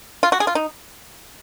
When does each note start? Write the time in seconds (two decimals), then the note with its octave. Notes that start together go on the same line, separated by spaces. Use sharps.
0.23 F4
0.32 F#4
0.40 G#4
0.47 F4
0.55 D#4